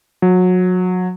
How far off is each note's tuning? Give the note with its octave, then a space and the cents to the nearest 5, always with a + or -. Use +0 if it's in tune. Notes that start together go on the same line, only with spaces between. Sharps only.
F#3 -25